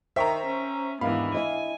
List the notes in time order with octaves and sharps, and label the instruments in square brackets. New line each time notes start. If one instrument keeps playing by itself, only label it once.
[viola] D#3 [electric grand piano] C5 G5 C#6 [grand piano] E5 A#5
[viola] C#4
[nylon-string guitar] D#2 G#2 D4 [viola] E3 B3 [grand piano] F5 [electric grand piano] B5
[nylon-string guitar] E4 D#5 [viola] G#5